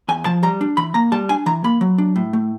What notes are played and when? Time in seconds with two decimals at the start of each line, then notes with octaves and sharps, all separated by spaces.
0.08 E2 G#5
0.25 F3 A5
0.43 G3 A#5
0.61 D4
0.77 E3 B5
0.94 A#3 A#5
1.12 G3 A5
1.29 D4 G#5
1.46 E3 A#5
1.64 A#3 B5
1.81 F#3
1.98 D4
2.16 A2
2.33 A3